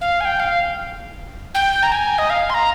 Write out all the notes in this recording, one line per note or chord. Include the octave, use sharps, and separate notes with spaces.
F5
G#5
G5
F5
G5
A#5
G#5
D#5
F5
C6
A#5